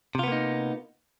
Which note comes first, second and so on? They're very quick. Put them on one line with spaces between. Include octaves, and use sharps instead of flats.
C3 F4 B3 A#3 D#4